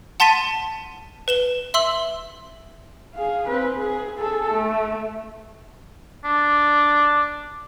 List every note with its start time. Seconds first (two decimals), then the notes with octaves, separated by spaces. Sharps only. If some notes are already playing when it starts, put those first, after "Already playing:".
0.20 F#5 A5 C6 A6 B6 D#7
1.28 B4 E7 G7
1.74 E5 C6 E6 F#7
3.15 G#4 F5
3.48 C4 B4
3.78 G#4
4.18 G#4 A4
4.52 A3
6.25 D4